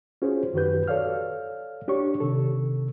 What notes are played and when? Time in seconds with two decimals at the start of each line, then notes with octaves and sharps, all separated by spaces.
0.22 C#4 F4 F#4 G#4 C5
0.54 F#2 D#3 F#4 G4 B4 G6
0.88 A4 C#5 D5 F5 F6
1.88 D4 G4 C#5 C#6
2.20 C3 D#3 A4